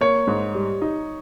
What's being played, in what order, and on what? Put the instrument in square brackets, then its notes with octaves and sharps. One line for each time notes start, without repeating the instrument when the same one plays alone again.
[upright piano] A#3 [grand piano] C#5
[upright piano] G#2
G3
D#4